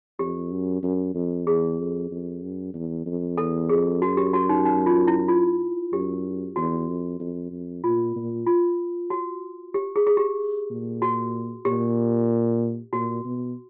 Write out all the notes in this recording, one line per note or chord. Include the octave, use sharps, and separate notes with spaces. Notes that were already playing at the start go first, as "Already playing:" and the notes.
F2 G4
F#2
F#2
F2
E2 G#4
F2
F2
F#2
E2
F2
E2 A4
F2 G#4
F#2 F#4
G4
F#4
D#4
D#4
F4
E4
F4
F#2 G4
E2 F#4
F2
F2
F2
A#2 F4
A#2
F4
F#4
G4
G#4
G#4
G4
A#2
F#4
A#2 G4
A#2 F#4
B2